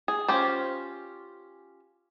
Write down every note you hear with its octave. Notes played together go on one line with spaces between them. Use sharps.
G#4
C#4 F4 G4 C5